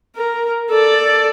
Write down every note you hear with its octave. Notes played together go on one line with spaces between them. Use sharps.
A#4
A4 D5